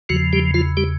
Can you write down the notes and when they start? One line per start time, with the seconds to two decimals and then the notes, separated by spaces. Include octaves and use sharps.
0.09 E2 C#3 F3 F#3 F#4
0.33 G3 G4
0.54 F3 F4
0.77 G3 G4